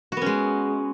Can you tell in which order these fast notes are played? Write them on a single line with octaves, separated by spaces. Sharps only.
F#4 B3 C#4 G#3